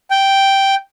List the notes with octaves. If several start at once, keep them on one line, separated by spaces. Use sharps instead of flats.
G5